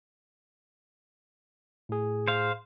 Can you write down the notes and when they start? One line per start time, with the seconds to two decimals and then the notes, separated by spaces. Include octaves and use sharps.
1.89 A2 G#4
2.28 C5 F5